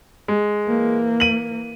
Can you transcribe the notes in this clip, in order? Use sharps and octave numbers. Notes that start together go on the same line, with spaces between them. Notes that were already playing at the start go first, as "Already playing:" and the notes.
G#3
E3 A#3
D#7 F#7